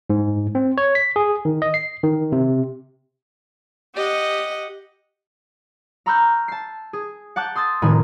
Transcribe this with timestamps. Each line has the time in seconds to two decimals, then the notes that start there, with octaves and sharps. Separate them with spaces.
0.10 G#2
0.55 C4
0.78 C#5
0.95 B6
1.16 G#4
1.45 D#3
1.62 D#5
1.74 C7
2.03 D#3
2.32 C3
3.94 G4 D#5 F#5
6.06 A#5 B5 C#6 E6 F6 G6
6.48 A5 C7
6.93 G#4
7.36 F#5 A5 D6 F#6 G6
7.55 C6 D#6 E6 A6
7.82 F1 A2 D#3 A#4 G#5 B5